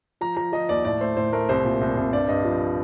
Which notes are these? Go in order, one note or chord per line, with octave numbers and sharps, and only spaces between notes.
F3 A#5
F3 A#5
F3 D#5
D#2 D5
A2 D5
A3 C5
A2 C5
A3 A#4
C2 C5
A#2
C2
C2
G2 D5
G2 D#5
F3